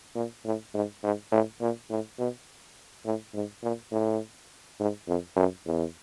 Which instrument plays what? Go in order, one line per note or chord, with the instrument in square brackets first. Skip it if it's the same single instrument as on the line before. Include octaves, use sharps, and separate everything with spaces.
[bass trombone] A#2
A2
G#2
G#2
A2
A#2
A2
B2
A2
G#2
A#2
A2
G#2
F2
F#2
E2